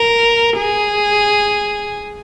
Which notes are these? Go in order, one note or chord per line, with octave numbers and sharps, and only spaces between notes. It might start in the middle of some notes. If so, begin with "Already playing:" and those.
Already playing: A#4
G#4